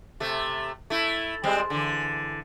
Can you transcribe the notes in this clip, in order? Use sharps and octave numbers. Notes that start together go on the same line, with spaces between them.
C3 A3
A3 E4
G3 G#3 C4
D3 E3